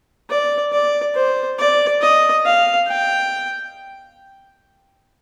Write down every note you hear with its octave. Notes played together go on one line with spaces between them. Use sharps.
D5
D5
C5
D5
D#5
F5
G5